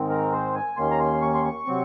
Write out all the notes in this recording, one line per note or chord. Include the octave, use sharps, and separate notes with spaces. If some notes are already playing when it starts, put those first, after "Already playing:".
Already playing: G#2 D#3 G#3 C4
A#4
C5
G#5
D#2 D#3 A#3 C#4 C6
A#5
C6
C#6
C6
C#6
C3 F#3 C4